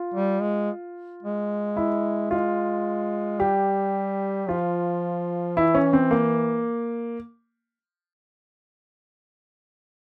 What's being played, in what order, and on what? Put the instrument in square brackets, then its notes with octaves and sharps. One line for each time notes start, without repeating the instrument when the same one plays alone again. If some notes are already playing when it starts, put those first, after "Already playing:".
Already playing: [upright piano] F4
[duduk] G3
G#3
G#3
[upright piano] E4
[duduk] G#3 [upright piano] F4
[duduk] G3 [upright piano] G4
[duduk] F3 [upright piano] F4
[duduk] E3 [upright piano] E4
[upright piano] C#4
C4
A#3